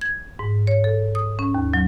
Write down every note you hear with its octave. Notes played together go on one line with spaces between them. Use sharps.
G#6
G#2
C#5
A4
D#6
C#4
D#2
F#3